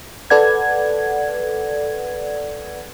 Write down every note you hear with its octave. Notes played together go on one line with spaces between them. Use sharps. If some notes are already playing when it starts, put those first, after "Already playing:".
A4 B4 D5 F#5 G#6